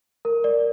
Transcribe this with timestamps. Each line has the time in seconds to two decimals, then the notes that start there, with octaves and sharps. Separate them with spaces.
0.25 A#4
0.44 D5